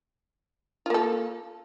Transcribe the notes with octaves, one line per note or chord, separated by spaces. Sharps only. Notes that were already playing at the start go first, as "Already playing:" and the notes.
A#3 F4 A4